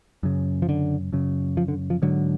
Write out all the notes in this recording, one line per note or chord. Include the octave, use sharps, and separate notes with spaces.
F#2 C#3
F3
D3
F#2 C#3
F3
D3
F3
G#2 D3 F#3